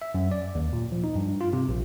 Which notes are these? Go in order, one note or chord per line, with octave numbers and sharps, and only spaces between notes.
E5
F#2
D5
D#2
A#2
F3
D#4
G2
F4
C3
A#1